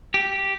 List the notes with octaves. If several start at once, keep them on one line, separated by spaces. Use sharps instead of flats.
G4